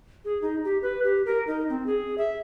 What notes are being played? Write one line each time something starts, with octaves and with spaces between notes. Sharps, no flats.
G#4
D#4
G4
B4
G4
A#4
D#4
C4
G#4
E5